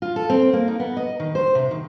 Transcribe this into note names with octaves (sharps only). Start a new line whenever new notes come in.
F4
A4
C4
A#3
D#4
B3
D#5
D#3
C5
C3
D#3